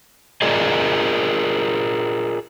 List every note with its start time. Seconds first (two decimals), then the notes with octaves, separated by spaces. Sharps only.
0.42 F4 G#4 A#4 D5 D#5